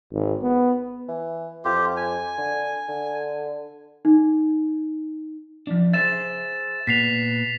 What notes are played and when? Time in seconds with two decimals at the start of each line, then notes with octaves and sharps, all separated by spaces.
0.13 G#1
0.42 B3
1.08 E3
1.65 F2 F4 G4
1.97 G#5
2.38 D3
2.88 D3
4.05 D#4
5.67 F3 D4
5.93 G#4 C5 E5 A6 E7
6.87 A#2 B3 B6 C7 F7